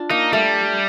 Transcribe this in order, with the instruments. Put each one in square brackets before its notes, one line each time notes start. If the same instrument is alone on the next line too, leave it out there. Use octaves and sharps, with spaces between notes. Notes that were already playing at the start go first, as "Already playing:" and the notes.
Already playing: [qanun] D4 F4
[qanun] A#3 [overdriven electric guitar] D#4
[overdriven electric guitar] G3 [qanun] A3